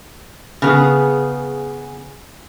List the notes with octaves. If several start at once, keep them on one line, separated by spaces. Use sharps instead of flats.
C#3 B3 G#4